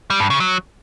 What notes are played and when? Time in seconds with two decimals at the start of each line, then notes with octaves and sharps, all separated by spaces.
0.10 G3
0.20 G2
0.30 C#3
0.40 F#3